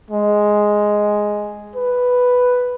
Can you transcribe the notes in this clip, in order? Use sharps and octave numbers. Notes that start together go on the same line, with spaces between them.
G#3
B4